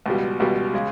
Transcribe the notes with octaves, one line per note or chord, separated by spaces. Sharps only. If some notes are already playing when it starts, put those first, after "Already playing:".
C#2 B2 G3
C#2 B2 G3
C#3 G#3